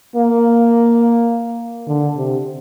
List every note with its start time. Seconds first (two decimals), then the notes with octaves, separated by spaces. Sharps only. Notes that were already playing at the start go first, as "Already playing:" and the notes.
0.16 A#3
1.87 D3
2.16 C3